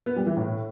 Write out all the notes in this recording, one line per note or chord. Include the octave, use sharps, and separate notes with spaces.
B3
G3
E3
A2